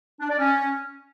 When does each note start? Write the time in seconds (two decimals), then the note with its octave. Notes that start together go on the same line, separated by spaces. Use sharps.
0.20 D4
0.29 D5
0.38 C#4